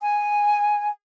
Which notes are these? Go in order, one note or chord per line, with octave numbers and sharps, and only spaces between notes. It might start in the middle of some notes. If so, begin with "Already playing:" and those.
G#5